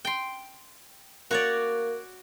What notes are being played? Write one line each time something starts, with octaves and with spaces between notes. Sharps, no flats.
G5 C6
A#3 F#4 C#5 D5